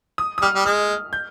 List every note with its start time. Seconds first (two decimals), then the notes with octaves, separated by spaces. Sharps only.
0.18 D#6
0.38 D#6
0.42 G3 F6
0.55 G3
0.65 G#3 F6
1.13 G6